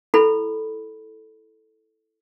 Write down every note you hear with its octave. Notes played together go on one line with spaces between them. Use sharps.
E4 A4 B5